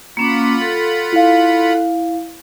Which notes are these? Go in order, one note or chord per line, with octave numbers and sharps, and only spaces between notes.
A#3 C#4 F4 F#5 B5 D6
A4
E4 F5